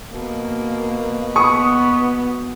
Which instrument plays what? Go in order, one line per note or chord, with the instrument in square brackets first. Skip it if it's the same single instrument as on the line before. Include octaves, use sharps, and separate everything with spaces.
[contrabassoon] B2 [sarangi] A#3
[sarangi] B3 [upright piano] B5 C#6 D#6